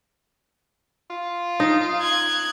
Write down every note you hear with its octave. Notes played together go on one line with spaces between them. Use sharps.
F4
D#4 D#6
F#6 G#6